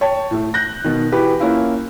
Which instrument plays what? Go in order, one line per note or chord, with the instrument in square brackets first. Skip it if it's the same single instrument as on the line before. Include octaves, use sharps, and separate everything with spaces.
[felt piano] C#5 G5 A5
A2 A3
F#6 G6 A#6
B2 D#3
E3 F#4 G4 B4
A#3 C#4 E4 F4